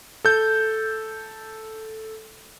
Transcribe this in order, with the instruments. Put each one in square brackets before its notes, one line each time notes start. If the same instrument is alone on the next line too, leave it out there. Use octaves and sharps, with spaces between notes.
[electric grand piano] A4 G6